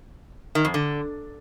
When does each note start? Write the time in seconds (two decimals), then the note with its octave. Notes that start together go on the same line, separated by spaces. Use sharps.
0.55 D#3
0.65 F2
0.74 D3